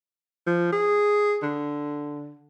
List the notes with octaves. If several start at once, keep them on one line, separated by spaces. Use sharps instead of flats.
F3
G#4
D3